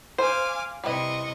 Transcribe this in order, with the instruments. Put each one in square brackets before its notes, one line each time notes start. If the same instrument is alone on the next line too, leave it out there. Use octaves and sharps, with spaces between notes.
[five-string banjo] C5 [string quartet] F5 G#5 D6
[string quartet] C3 D#5 C#6 [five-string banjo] E3 G3